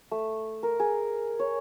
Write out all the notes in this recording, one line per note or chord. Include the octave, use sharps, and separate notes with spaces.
A3
A#4
G#4
C#5